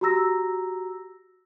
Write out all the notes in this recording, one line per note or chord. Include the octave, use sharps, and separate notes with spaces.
F#4 G4 A#5 E6 A#6